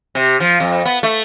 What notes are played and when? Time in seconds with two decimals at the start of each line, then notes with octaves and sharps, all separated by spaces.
0.15 C3
0.40 F3
0.60 F2
0.85 B3
1.03 A3